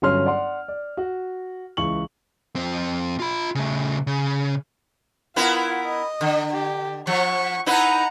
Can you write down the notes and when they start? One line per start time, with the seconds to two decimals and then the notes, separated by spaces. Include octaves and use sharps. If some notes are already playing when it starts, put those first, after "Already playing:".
0.02 G1 F#3 C#4 C6 F6
0.26 D5 F#5 C6
0.68 D5
0.97 F#4
1.77 C#2 E3 C#6 F#7
2.56 F2 C4
3.19 F4 B5
3.55 C#3 A3
4.07 C#3
5.36 B3 E4 F4 A#4
5.86 D#5
6.21 D3
6.52 G4
7.07 F3 F#5 C#6
7.66 D#4 E4 B4 F#5 A#5